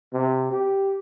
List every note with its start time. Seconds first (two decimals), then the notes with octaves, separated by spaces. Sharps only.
0.13 C3
0.52 G4